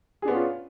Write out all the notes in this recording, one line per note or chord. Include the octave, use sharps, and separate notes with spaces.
B3 C#4 D4 F4 G#4